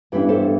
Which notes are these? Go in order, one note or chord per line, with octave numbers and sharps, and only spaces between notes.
G2 E3 B3 D4 G4 B4
A4 C5